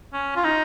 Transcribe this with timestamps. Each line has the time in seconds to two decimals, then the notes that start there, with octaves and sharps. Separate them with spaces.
0.13 C#4
0.36 F4
0.44 D#4